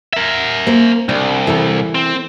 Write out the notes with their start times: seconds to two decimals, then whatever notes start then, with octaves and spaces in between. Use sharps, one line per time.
0.13 A#4 E5
0.67 A#3 C5
1.09 C2 D4
1.47 E3 A4 A#4
1.95 C4